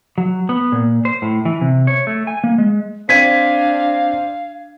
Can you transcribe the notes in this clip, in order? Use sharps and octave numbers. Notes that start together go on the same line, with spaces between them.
F#3
B3
A#2
C5
A2
E3
C3
C#5
A3
G#5
A#3
G#3
C4 D4 F5 G#6 B6 D#7